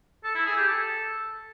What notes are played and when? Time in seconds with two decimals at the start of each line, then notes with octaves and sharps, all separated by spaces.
0.24 A4
0.35 E4
0.46 G#4
0.57 G4
0.68 A4